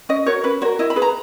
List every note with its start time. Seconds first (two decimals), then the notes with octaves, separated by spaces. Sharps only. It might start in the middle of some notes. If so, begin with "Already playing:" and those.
0.09 C#4 D#5
0.26 F#4 A#4 C#5
0.44 C#4 B4
0.62 F#4 A#4 C#5
0.79 E4 D#5
0.90 B5
0.96 G#4 B4
1.02 A#5